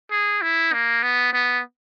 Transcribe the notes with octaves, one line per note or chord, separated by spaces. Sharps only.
G#4
E4
A#3
B3
B3